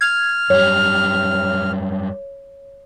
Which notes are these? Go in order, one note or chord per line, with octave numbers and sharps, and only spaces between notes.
F6 G#6
F#2 G3 C#5